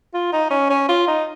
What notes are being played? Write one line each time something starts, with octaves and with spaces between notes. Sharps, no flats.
F4
D#4
C#4
C#4
F4
D#4